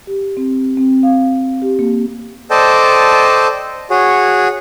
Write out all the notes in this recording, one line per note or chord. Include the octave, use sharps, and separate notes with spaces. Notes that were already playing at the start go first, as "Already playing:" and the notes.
G4
C4
C4
F5
G4
A#3
A4 C5 D5 D#5 G5 A5
F#4 G#4 C#5